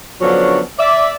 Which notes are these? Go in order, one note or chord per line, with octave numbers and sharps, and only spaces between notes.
D3 F3 F#3 B3 C#4 D4
D5 E5